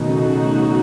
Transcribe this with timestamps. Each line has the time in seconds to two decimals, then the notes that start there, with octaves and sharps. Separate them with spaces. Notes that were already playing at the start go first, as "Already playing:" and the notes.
Already playing: B2 D#3 F#3 A3 D#4 F#4
0.09 C#3
0.25 C#3